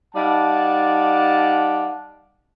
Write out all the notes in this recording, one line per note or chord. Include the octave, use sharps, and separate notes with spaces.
G3 D#4 D5 F5 F#5 A5